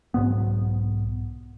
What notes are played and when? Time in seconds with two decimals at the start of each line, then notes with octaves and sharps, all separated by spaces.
0.14 B1 E2 G#2 B3